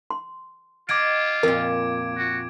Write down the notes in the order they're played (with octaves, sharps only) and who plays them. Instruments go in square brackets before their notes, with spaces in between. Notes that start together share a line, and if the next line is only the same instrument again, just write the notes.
[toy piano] C6
[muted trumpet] F4 [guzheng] D#5 F#5 [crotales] D6 G#6 D7
[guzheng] F2 A#2 [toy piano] A#4
[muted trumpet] F#4